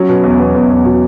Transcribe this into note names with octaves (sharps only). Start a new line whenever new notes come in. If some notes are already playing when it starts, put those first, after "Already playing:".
Already playing: F#3 C#4
B2
E2
E2
E2
E2
B2